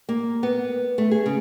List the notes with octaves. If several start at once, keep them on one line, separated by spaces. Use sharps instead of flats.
A#3
B3
A3
G#4
C#3